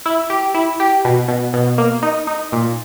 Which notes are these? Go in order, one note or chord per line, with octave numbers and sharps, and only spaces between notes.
E4
G4
E4
G4
B2
B2
B2
A#3
D#4
D#4
A#2